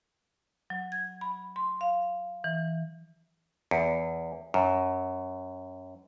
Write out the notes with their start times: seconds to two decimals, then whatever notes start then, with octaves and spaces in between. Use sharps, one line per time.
0.70 F#3
0.92 G#6
1.21 B5
1.56 C6
1.81 F5
2.44 E3
3.71 E2
4.54 F#2